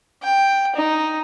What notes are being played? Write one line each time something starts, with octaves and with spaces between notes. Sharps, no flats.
G5
D#4